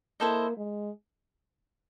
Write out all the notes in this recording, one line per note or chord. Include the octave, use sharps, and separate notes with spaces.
A#3 E4 A4 C5 D#5
G#3